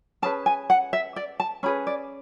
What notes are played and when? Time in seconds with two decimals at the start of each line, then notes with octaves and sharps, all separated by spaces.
0.22 C#4 G#4 B4 A5
0.46 G#5
0.70 F#5
0.93 E5
1.16 D5
1.40 A5
1.63 C#4 G#4 B4 B5
1.87 D5